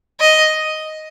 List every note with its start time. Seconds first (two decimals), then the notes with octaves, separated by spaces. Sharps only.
0.20 D#5